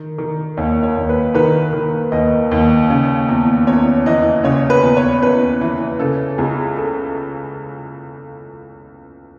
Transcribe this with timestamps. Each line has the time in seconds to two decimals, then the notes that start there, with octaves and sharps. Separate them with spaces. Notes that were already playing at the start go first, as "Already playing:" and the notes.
Already playing: D#3
0.18 D#3
0.57 D#2 C#5
0.83 C#5
0.96 D#2
1.09 B4
1.34 D#3 B4
1.73 D#3
2.12 D#2 D#5
2.51 D#2
2.90 C#3
3.28 E2
3.67 E2 C#5
4.06 E3 D#5
4.44 C#3 C#5
4.70 B4
4.83 E2
4.97 C#5
5.21 E2 B4
5.61 E3
5.99 C#3 A4
6.38 C#2 G#4
6.76 A4